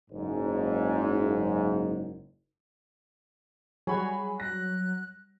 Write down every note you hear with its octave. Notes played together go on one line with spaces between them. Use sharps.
F#1 G#2
F#3 G3 F#4 G#4 C#5 B5
F#6 A#6